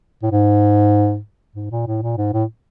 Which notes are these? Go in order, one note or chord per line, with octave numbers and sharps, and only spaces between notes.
A2
G#2
G#2
A#2
A2
A#2
G#2
A2